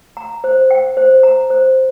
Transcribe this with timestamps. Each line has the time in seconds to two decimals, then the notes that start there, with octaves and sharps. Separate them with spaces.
0.17 A#5
0.44 C5
0.71 G5
0.97 C5
1.23 A#5
1.50 C5